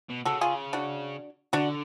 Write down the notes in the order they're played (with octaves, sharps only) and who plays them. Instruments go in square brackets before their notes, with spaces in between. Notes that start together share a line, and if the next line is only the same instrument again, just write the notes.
[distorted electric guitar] B2
[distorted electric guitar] C#3 [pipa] F#4 A4
[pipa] F4 G#4
D4 F#4
[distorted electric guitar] D3 [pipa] D4 F#4